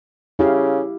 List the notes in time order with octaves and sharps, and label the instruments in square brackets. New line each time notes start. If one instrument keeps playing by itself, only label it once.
[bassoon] C#3 [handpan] E4 G4 F5